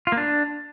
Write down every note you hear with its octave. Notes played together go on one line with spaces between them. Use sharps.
F4
A#3
D4